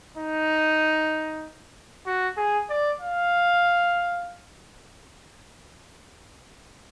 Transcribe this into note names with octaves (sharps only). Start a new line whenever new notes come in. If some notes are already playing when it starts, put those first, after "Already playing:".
D#4
F#4
G#4
D5
F5